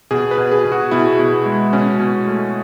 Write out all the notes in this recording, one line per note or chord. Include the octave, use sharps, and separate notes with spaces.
B2 G#4
B4
B2
G#4
B2
F#4
B2 E4
B2
G#3
B2 C#4
B2
A3